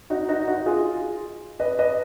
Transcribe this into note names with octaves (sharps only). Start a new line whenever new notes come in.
D#4 F#4
D#4 F#4
D#4 F#4
F4 G#4
B4 D#5
B4 D#5